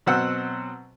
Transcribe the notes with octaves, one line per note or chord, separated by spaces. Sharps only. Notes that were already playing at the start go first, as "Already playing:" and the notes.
B2 F#3 C4 C5 F#5 E6